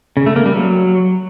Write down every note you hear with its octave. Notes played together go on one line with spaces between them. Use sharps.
C#3
A3
A#3
G3
F#3